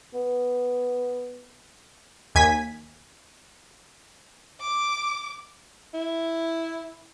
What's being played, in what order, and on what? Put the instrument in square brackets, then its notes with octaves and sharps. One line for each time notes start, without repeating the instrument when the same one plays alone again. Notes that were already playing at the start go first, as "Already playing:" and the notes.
[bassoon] B3
[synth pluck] D#2 G#5 G#6 B6
[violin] D6
[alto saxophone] E4